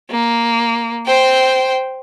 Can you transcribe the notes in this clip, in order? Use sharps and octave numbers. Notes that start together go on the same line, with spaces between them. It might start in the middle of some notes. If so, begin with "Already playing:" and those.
A#3
C5 G5